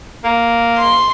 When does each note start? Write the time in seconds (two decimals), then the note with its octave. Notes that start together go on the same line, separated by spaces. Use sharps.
0.24 A#3
0.77 C6